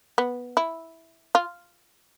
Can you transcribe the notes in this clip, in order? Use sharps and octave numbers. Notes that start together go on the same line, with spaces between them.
B3
E4
F4